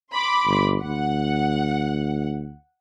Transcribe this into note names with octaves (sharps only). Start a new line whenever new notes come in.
B5 C6 D6
G1
D2 F#5